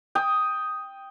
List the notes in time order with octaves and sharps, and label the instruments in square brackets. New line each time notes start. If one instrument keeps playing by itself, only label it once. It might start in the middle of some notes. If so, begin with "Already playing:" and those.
[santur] G5 D#6